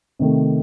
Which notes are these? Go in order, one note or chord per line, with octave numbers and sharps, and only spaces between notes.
C3 D#3 A3